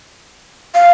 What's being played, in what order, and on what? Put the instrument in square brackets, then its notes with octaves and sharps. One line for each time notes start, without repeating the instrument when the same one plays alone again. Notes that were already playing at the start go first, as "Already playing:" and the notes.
[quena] F5